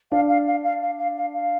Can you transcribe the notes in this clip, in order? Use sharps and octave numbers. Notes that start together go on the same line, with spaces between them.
D4 F5
F5
F5
F5
F5
F5
F5
F5